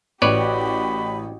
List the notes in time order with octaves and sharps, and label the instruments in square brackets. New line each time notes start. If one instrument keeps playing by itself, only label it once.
[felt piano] A1 [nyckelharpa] F#4 G4 [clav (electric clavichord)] B4 C#5 D5 [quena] B5